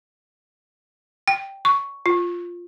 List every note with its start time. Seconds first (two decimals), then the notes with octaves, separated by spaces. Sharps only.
1.28 G5
1.65 C#6
2.06 F4